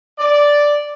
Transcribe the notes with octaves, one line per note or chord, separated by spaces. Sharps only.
D5